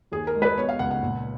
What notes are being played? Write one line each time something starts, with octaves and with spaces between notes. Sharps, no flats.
D#2 G#4
A#4
G#3
B4
B2 C#5
F5
C#2 F#5
F#5
A#2